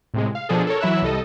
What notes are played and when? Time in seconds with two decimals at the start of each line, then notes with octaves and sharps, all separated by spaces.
0.14 A2 C3 G#3
0.35 F5
0.49 B2 F3 D4 G#4 A4
0.67 A4 A#4 C#5
0.80 E3 F#3 E4 E5 E6 F#6
1.02 C2 G3 A4 D#5